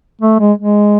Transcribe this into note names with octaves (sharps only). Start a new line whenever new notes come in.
A3
G#3
G#3